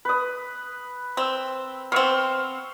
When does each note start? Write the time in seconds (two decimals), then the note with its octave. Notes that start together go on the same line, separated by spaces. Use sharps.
0.05 B4 D#6
1.17 C4 E6
1.92 B3 C4 F5 C#6 E6